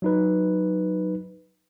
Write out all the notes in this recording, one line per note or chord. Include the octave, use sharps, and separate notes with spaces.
F#3 D#4 B4